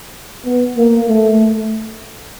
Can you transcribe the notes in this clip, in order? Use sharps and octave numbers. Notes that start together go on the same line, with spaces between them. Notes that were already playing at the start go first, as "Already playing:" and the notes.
B3
A#3
A3
A3